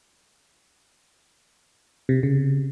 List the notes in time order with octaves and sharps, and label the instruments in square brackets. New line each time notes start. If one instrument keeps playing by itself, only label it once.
[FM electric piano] C3
C#3